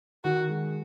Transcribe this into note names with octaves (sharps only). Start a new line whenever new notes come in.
D#3 F#4
G#3